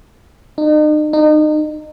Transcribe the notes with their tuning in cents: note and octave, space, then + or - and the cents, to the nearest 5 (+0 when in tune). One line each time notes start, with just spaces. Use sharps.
D#4 -40
D#4 -30